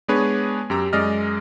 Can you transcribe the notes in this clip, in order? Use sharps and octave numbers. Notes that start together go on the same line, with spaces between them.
G#3 B3 D4 G#4 B4 C#5
F#2 G4 A#5 E6
F#2 G#3 D5 D#5 F6